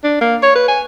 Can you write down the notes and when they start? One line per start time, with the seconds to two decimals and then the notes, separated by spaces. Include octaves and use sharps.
0.04 D4
0.21 A#3
0.43 C#5
0.55 B4
0.68 G#5